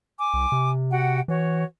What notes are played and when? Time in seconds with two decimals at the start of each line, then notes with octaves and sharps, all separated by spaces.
0.18 G#5 D6
0.34 C2
0.52 C3
0.91 F#4 F#5 G5
1.28 E3 F#4 C#5